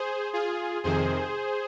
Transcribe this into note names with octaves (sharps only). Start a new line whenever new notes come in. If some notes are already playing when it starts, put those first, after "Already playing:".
Already playing: G#4 C5
F4 G#4
F2 C3 D#3 G#4 C5